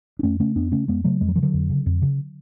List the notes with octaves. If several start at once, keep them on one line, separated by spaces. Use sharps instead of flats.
D4
F2 A3 C#4
C#3 A3 C#4
F2 B3 D4
C#3 A3 C#4
F2 G#3 B3
C#3 F#3 A3
F2 G#3
F#3
C#3 F3
D3 F#3
F2
C#3
F2
C#3